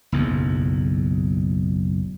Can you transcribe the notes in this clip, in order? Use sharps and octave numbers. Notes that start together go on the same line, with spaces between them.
F#1 B1 E2